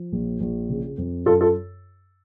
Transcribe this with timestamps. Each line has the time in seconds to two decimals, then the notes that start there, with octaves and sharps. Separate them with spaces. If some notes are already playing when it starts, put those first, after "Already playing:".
Already playing: F3
0.12 A#1
0.40 A#1
0.69 C#3
0.98 F2
1.26 F#2 F4 A4
1.41 F4 A4